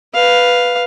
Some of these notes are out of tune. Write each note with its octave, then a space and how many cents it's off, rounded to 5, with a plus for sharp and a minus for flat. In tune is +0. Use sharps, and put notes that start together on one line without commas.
B4 +0 F5 +0